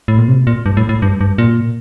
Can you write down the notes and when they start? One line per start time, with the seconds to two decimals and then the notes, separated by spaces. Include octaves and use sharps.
0.08 A2
0.18 A#2
0.28 C3
0.47 A#2
0.66 G2
0.77 A2
0.89 A2
1.02 G2
1.21 G2
1.38 A#2